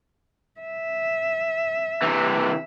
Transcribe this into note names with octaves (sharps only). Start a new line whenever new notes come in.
E5
C3 E3